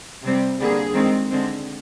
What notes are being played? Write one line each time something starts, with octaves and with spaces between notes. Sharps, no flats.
C3 G3 C4
D3 G3 A#3 G#4
D#3 G#3 C4
D3 G#3 C4